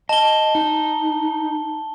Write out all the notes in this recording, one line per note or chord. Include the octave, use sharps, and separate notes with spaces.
D#5 A5 G7
D#4